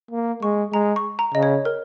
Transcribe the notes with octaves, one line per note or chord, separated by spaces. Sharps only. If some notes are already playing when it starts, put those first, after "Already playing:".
A#3
G#3 C#6
G#3 A#5
C#6
A#5
C#3 D#5
C#5
A#4